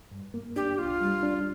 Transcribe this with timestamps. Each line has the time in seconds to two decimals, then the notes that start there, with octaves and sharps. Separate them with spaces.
0.11 G2
0.34 A#3
0.56 D4 G4
0.78 C2 F4
1.01 G3
1.23 D4